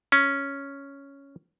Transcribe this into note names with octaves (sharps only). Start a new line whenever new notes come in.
C#4